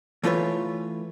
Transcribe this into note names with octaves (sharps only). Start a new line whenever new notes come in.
E3 A3 F4 B4 C#5